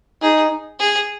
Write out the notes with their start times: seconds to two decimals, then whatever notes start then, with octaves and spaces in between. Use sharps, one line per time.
0.22 D#4 G#4
0.79 G#4